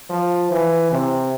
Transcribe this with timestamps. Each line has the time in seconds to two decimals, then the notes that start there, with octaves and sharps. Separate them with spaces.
0.10 F3
0.51 E3
0.92 C3